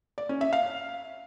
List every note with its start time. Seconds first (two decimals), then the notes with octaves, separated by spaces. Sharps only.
0.18 D5
0.29 C#4
0.41 E5
0.53 F5